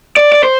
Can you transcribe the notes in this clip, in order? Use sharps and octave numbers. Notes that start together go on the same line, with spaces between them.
D5
D5
C5